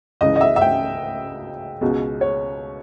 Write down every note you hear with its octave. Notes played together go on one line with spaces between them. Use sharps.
C#2 C#3 E3 D#5
D#5
E5
E5
G5
C#2 B2 G#3
C#5